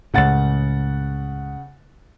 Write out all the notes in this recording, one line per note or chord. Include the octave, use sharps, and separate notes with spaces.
C#2 A2 C#3 F#5 A6